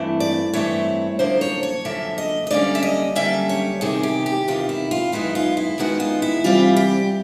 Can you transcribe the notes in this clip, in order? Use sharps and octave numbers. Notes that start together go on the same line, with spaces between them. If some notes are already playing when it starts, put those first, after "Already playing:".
Already playing: G2 E3 A3 C4 E4
D5
G2 E3 A3 C4 E4 C#5
F#2 D3 F3 A#3 C5
C#5
C#5
F#2 D3 F3 A#3 E5
D#5
D#5
F#2 D3 G3 A#3 C#4 D5
E5
D#5
F#2 D3 G3 A#3 C#4 E5
C#5
E2 C3 D#3 G#4
G4
G4
E2 C3 D#3 F4
E4
F4
F#2 D#3 G#3 B3 D#4 E4
F4
E4
F#2 D#3 G#3 B3 D#4 F#4
F4
E4
C3 E3 G3 C4 E4 F4
G4